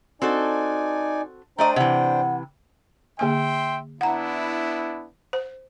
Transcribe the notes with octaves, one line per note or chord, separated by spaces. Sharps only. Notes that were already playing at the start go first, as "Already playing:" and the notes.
C4 D#4 F#4 A4 D5 G#5
A3 D4 C5 D5 D#5 G5 A#5
C3 E3 F#5
D3 A#3 E5 G5 G#5 C6
B3 D4 E4 F#5 A#5
C5